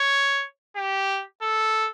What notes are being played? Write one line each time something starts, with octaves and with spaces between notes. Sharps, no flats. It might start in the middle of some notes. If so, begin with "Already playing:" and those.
Already playing: C#5
G4
A4